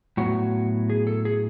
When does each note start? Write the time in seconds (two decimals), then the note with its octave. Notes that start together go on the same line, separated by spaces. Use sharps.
0.17 A2 F#3 B3 F#4
0.90 G#4
1.07 A4
1.25 G#4